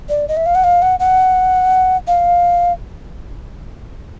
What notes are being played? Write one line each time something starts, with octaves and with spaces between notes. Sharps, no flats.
D5
D#5
E5
F5
F#5
F5
F#5
F#5
F5